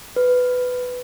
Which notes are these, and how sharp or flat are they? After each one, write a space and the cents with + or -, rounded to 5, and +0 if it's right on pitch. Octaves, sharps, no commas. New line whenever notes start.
B4 +15